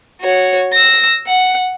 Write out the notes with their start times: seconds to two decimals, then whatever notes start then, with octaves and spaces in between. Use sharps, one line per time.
0.21 F#4 C#5
0.73 E6 A#6
1.27 F#5